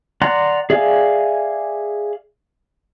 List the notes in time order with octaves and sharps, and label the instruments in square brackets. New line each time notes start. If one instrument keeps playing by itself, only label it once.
[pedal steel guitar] D5 F#5 A#5 C6 F#6
G#4 D5 E5 F5 G#5